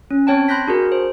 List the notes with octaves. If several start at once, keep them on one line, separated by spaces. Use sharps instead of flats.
C#4
C4 C#5 G5 A5
B5 C6 F#6 G6 A#6 B6
D4 F#4 G#4 A#4
C5